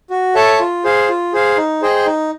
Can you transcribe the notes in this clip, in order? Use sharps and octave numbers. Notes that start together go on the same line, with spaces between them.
F#4
A4 C#5 E5 A5
F4
G#4 C5 F5
F4
G#4 C5 F5
D#4
G#4 C5 D#5 G5
D#4